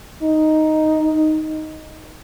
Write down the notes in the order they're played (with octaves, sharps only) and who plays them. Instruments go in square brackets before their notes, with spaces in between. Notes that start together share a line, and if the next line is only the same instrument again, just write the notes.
[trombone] D#4